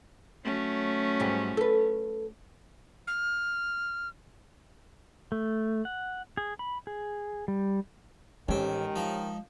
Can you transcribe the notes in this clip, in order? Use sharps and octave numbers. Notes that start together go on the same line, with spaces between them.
F#3 A3 C#4
G#2 G3 G#3
A4 B4
F6
A3
F#5
G#4
B5
G#4
G3
A1 D#3 G#3 C4 C#4 G4
F3 D#4